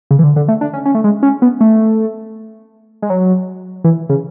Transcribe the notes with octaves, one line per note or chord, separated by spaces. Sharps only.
C#3
E3
D3
D3
A3
D4
C#4
C#4
A3
G#3
C#4
B3
A3
G#3
F#3
E3
C#3